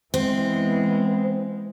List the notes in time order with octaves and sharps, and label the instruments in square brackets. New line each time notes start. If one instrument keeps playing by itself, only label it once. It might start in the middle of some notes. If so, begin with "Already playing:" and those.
[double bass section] E3 B3 [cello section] G#3 [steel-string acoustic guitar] C4